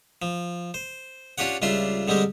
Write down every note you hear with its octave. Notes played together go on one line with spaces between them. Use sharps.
F3
C5
C#4 D4 F4 G4 C#5 F#5
C#2 G3 D4 F4 E5 C6
D3 G3 G#3 C4 G4